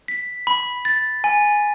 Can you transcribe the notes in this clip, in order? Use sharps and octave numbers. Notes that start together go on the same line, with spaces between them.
B6
B5
A6
G#5